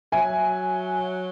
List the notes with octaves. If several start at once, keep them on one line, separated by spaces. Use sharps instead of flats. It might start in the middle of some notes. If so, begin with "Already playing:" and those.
F#3 E5 G#5